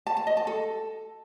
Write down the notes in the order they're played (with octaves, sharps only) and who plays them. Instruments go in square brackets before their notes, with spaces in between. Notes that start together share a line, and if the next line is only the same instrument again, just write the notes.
[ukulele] A5
A5
D#5
A5
A4